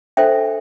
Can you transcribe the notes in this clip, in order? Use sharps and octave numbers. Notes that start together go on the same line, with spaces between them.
D4 A4 C5 E5 G5